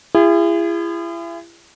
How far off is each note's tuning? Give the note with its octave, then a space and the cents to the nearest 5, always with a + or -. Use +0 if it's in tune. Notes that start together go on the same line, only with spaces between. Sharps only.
E4 +40 G#4 -35